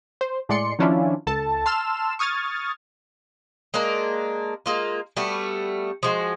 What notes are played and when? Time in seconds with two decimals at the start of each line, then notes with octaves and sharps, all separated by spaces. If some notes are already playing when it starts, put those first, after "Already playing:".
0.21 C5
0.49 A2 G#3 D5 C6 C#7
0.79 D#3 F3 C#4 D4 E4 F4
1.27 C#2 A4 A5
1.66 A5 C6 E6 F6 E7
2.19 C#6 D#6 F6 G#6 A6
3.74 G#3 A#3 D4 A#4
4.66 G#3 A#3 F4
5.17 G3 A3 B3 F#4
6.03 F3 G#3 F#4